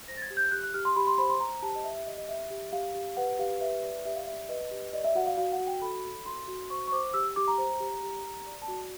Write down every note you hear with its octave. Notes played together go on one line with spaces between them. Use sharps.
C5 A#6
A6
G#6
G4
G6
G4 F#6
F#6
G4 F6
C6
G4 B5
C6
C5 B5
C6
C5 A#5
G4 A5
D#5
G4 E5
E5
G4 D#5
D#5
G4 E5
G4
G4 F5
G4
B4 F#5
G4 F5
B4 E5
D5
G4 E5
F5
D5 E5
B4 D#5
G4
D5 D#5
E5
F#4 F#5
F5
F#4 F5
F#5
F#4
G5
A4 B5
A4
F#4 C6
F#4
C5 C#6
C#6
C5 D6
G4 E6
G4 D6
A#5
C5
G4
G4
G4
D5
A5
F#4